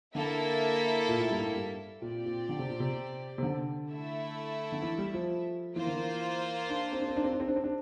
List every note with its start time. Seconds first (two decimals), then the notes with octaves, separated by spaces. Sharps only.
0.15 D3 A#3 E4 A4 E5
1.09 A#2
1.19 A2
1.30 G2
1.40 A2
1.55 G2
2.02 A#2 C4 G4 D5
2.26 A#2
2.49 D3
2.59 C3
2.70 A#2
2.80 C3
3.38 C3
3.43 D3
3.89 A3 E4 A4 E5
4.72 D3
4.82 E3
4.98 G3
5.14 F3
5.76 E3 A#3 F4 C5
5.87 D3
5.97 E3
6.70 D4
6.92 C4
7.00 D4
7.08 C4
7.16 D4
7.24 C4
7.33 D4
7.40 C4
7.48 D4
7.56 C4
7.64 D4